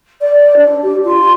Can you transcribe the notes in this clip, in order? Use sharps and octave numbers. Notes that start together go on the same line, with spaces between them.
D5
D4
G4
F4